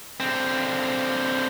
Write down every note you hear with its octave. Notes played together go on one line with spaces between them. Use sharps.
D3 C4